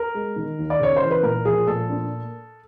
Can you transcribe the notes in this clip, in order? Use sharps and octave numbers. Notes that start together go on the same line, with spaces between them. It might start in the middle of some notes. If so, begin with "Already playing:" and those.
Already playing: A#4
G#3
D#3
D#2
D5
C#3 C#5
E3 C5
B4
A#2 A#4
F3 G#4
A#2 A4
D4